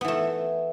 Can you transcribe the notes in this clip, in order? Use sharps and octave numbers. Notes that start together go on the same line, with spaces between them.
E3 A3 B3